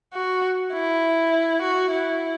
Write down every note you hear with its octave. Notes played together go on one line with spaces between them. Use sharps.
F#4
E4
F#4
E4